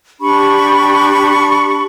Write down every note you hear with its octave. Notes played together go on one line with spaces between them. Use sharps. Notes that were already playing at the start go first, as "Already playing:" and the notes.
D4 G4 B5 C#6